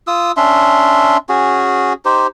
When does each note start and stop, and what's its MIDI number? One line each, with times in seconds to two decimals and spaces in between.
0.07 0.32 65
0.07 0.32 87
0.07 0.32 88
0.37 1.17 61
0.37 1.17 62
0.37 1.17 76
0.37 1.17 84
1.29 1.93 61
1.29 1.93 66
1.29 1.93 68
2.05 2.27 63
2.05 2.27 67
2.05 2.27 72